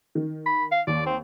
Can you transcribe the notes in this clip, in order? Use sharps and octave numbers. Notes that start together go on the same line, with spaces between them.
D#3
B5
F5
D#2 D5
C4